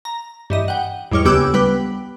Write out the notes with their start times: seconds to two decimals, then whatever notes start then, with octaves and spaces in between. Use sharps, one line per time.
0.05 A#5
0.50 G2 E3 D#5
0.68 F#5 G5
1.12 E2 G#2 G3 C#5 F6
1.25 D2 C#3 B3 G4 D6 E6
1.54 G3 B3 B4